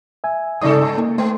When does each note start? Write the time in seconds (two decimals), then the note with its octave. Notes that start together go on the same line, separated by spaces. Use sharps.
0.24 E5 G#5
0.61 G2 C#3 A4 D5 D#6
0.98 A#3
1.18 A3 B3